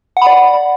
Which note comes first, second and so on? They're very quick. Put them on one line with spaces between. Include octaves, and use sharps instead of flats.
F#5 B5 D5